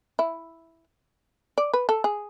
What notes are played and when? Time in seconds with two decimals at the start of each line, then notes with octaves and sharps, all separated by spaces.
0.19 E4
1.58 D5
1.73 B4
1.89 A4
2.04 G#4